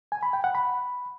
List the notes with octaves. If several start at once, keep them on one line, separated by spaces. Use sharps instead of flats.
G#5
B5
G5
F#5
B5